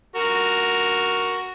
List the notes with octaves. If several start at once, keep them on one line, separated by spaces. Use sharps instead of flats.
F#4 A#4